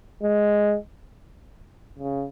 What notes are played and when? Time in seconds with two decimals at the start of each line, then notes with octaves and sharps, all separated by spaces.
0.23 G#3
1.99 C#3